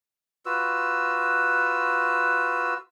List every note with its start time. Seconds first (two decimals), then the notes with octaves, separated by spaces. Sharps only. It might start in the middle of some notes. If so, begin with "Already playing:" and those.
0.46 F4 F#4 B4 E6